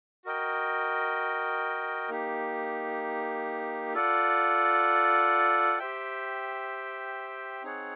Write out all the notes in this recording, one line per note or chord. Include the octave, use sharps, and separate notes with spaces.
F#4 A#4 D#5 G5
A#3 D#4 G4
F4 A4 D5 F#5
G4 C5 E5 G5
C4 D#4 G#4 C#5 F#5